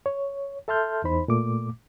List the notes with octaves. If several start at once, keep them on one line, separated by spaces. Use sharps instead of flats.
C#5
A4 E5 A5 C6 F6 G6
E2 D#4 C5 B5
A#2 A3 D6